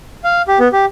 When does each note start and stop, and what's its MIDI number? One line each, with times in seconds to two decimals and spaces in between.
0.24 0.42 77
0.48 0.59 67
0.59 0.68 59
0.72 0.86 67